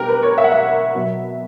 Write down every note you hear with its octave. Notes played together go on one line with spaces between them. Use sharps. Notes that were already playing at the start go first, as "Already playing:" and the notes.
Already playing: B2 G3 B3 D4 G4 A#4
B4
C#5
E5
F#5
E5
B2 F#3 B3